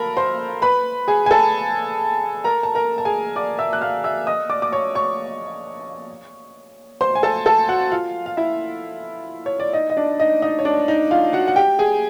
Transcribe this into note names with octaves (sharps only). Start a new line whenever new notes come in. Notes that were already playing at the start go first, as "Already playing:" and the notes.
Already playing: A4 A#4 A#5 B5
C5 C6
B4 B5
G#4 G#5
G#5
A4 A5
A#4 A#5
A5
A#4 A#5
A5
G#4 G#5
D5 D6
E5 E6
F#6
F5 F6
E5 E6
D#5 D#6
D5 D6
D6
C#5 C#6
C#5 C#6
C5 C6
G#5
A4 A5
A4 A5
F#4 F#5
F4 F5
F5
E4 E5
C#5
D5
D#4 D#5
D#5
D4 D5
D#4 D#5
D#4 D#5
C#5
D4 D5
D#4 D#5
F4 F5
F#4 F#5
F#5
G4 G5
G#4 G#5